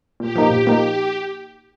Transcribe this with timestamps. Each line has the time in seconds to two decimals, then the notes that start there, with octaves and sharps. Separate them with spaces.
0.20 A#2 G4
0.36 F3 A#3 D#4
0.51 A#2
0.65 F3 A#3 D#4